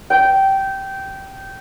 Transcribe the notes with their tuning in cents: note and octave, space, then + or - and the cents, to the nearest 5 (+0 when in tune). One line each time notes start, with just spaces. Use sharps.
G5 -15